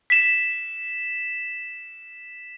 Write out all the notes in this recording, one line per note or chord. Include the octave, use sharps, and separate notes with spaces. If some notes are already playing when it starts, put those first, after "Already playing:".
B6 E7